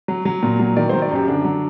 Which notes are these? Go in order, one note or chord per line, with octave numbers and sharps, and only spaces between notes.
F#3
F#3
A#2
F#3
D#3 D5
F#3 C5
D5
F#2 G4
D3 D4
F#3